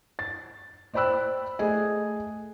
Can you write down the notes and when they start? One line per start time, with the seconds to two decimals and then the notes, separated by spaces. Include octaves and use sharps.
0.19 A6
0.94 C5 D5 G5 B5 E6 F#6
1.59 A3 G#4 D#5 G#5